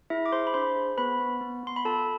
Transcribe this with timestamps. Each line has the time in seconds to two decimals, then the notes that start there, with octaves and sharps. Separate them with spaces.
0.10 E4 G#4 E5
0.26 D6
0.32 G#4 C5 C6
0.47 B5
0.54 D4 C5 C6
0.76 G#4
0.97 B3 B4 B5
1.20 B3
1.41 B3
1.63 B3 C6
1.76 B5
1.85 F4 A4 A5